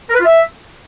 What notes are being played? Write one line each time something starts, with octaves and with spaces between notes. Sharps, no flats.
A#4
B4
F4
E5